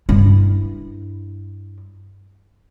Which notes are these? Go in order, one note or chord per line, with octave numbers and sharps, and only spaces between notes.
G2 E4